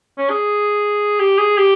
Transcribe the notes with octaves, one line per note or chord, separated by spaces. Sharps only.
C#4
G#4
G4
G#4
G4